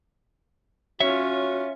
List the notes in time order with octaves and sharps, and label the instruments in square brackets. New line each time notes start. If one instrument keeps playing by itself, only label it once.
[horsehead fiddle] C#4 F4 [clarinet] F#4 [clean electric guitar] C#5 E5